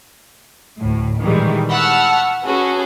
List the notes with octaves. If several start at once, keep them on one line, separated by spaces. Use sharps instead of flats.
D2 A2
A#2 D#3 E3 G3 G#3
F#5 A5 B5 C#6 E6 F6
C#4 F#4 G#4 A4 B4